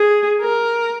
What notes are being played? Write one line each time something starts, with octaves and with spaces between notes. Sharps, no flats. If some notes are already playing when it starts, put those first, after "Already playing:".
Already playing: G#4
A#4